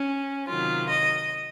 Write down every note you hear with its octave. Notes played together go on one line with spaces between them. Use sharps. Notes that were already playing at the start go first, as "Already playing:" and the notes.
Already playing: C#4
C3 D#3 F#3 F4
D#5